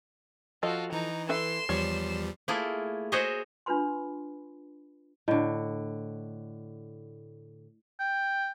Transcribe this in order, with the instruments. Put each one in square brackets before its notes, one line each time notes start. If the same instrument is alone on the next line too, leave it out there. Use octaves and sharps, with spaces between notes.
[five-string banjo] F3 A4 D#5 [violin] F4 F#4
[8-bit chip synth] E3 [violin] D#4 A#5
[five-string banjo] A4 B4 E5 [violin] C6 E7
[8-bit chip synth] E2 F3 G3 [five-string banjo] C#5
[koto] A3 A#3 E4 F4 G#4
F#4 G#4 C5 C#5 D#5 E5
[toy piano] D4 F4 B4 B5 C6
[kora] A2 D3 [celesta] E4 D#5
[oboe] G5